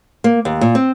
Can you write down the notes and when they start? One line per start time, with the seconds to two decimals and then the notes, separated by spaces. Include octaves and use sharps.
0.24 A#3
0.45 D#2
0.61 A#2
0.75 C4